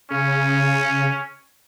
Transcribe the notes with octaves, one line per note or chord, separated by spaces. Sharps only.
C#3 C#4